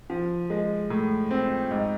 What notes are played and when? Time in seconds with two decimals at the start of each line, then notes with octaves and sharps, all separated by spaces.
0.10 F3
0.50 G#3
0.90 A2
1.31 C4
1.71 G#2